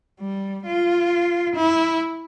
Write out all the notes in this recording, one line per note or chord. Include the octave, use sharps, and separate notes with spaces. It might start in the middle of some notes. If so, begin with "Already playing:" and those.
G3
F4
E4